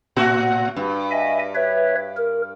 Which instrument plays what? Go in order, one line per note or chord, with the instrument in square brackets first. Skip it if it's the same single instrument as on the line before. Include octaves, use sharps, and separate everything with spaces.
[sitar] A2 F#4
G2
[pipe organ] D#5 E5 G#5
B4 C#5 E5
A#4